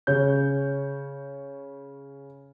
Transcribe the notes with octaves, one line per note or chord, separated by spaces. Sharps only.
C#3 C#5 G6